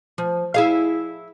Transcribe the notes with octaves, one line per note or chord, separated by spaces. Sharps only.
F3
E4 G#4 F5